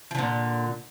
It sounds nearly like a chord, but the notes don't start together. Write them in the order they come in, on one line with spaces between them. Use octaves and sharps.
F3 D3 A#2